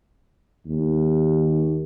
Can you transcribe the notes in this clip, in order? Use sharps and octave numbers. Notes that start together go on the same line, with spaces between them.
D#2